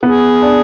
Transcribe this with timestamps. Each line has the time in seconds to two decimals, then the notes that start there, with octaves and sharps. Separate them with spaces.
0.03 B3 G#4
0.42 D4